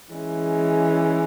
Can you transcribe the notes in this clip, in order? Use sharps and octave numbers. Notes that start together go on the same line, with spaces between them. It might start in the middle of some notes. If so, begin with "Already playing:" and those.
E3 G#3 C#4